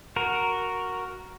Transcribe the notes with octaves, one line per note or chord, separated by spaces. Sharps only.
F#4 A#4